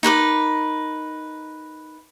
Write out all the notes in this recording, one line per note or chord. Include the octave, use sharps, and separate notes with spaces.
D#4 A#4 B4 D6